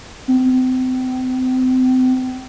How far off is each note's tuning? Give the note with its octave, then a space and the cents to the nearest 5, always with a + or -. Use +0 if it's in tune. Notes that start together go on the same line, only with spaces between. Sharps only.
C4 -35